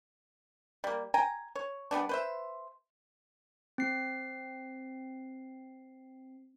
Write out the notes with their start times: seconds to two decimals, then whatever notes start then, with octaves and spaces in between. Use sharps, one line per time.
0.84 G3 A#3
1.14 G5 G#5 A#5
1.56 C#5
1.91 G3 G#3 B3 D4
2.09 B4 C5 E5
3.78 C4 C7